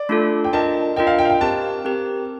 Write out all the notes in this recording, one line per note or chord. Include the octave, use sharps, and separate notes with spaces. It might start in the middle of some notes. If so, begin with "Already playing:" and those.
Already playing: D5
A3 D4 F4 A4
G5
D4 F4 A#4 D#5 A5
D4 F4 A#4 D#5 G5
F5
G5
F5
G5
C4 G4 A#4 A5
C4 G4 A#4